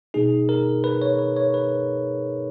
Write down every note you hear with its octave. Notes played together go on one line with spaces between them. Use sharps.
B2 A#3 D#4 G#4
A#4
B4
C#5
B4
C#5
B4